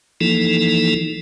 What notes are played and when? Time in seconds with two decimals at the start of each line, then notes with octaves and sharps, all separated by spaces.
0.21 E3 F3 A#3 D#4 E4 A4